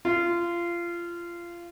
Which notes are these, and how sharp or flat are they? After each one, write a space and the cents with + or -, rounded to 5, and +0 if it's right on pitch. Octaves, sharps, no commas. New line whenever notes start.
F4 -25